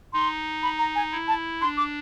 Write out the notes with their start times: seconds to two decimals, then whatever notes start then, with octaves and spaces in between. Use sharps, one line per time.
0.13 D#4 C6
0.63 B5
0.79 A#5
0.95 G#5
1.12 E4
1.28 A5
1.61 D4 C6
1.77 D6